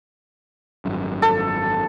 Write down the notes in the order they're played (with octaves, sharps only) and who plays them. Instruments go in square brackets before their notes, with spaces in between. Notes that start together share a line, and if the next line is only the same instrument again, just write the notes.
[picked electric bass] G#1 F#2
[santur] A4